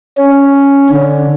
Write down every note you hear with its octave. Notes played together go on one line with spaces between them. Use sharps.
C#4
D3